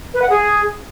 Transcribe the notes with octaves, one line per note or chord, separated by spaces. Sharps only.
B4
F#5
G#4